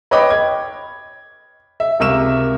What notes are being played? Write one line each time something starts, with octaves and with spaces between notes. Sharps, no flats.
B4 C#5 D#5 G5 B5 D6
G#6
E5
C#2 C3 A#4 E5 C#6 E7